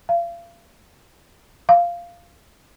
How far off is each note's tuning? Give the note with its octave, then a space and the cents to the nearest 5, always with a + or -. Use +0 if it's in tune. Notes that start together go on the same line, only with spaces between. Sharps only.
F5 -35
F5 -10